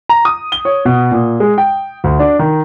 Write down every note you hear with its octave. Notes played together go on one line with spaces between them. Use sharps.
A#5
D#6
G7
C#5
B2
A#2
G#3
G5
D2
D4
D#3